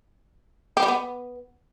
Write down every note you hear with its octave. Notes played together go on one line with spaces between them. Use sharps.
G4
G3
B3